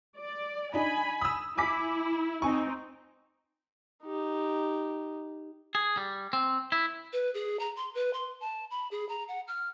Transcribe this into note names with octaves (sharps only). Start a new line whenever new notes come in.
D5
D4 D#4 G#5 B5
D#6 E6
E4 G#5 D6 B6
C4 D#4 G#5 C#6
D#4 G4
G#4
G3
C4
E4
B4
G#4
A#5
C6
B4
C6
A5
B5
G#4
A#5
F#5
F6